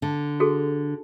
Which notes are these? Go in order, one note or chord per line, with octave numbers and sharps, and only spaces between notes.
D3
F#4 G#4 A4